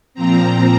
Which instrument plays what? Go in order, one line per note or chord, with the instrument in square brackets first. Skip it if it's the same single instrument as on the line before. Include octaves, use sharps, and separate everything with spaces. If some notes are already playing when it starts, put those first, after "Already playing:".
[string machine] A#2 F3 C4 A#5